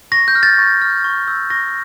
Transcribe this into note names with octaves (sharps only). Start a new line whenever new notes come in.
C#6 A#6
G6
F6
A6
C#6
F6
C#6
E6 G6
C#6 A#6